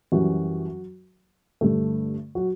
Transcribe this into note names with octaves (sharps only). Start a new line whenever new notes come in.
F#2 E3 F#3 G3 F#4
G2 D3 A3
F#3 F#4